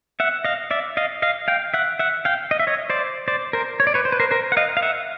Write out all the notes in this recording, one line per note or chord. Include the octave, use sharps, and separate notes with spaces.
E5 F#5
D#5 F5
D5 E5
D#5 F5
D#5 F5
F5 G5
E5 F#5
E5 F#5
F5 G5
D#5
E5
C#5 D#5
C5 D5
C5 D5
A#4 C5
C#5
D5
B4 C#5
C5
B4
A#4 C5
A#4 C5
F#5
D#5 F5
F5
E5 F#5